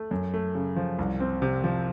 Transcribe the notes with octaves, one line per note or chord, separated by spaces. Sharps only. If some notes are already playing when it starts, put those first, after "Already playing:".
Already playing: A3
F#2
A3
C#3
F3
C2
C4
C3
F3